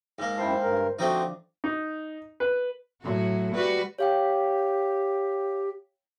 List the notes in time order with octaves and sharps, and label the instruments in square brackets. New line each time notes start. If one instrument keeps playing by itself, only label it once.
[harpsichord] G#2 A#3
[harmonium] F#2 E4 A5 [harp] C5 G5 A#5
[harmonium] G2 A#4
[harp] F3 D4 [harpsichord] A3 C4 D#4 [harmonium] F#4 C5
[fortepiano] D#4
B4
[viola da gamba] A2 F#3 F#4
G3 F#4 B4
[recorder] G4 [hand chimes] C#5 F5 G5